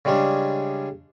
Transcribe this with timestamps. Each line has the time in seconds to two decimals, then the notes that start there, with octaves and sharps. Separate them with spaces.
0.05 C#3 G3 G#3 C#4 D4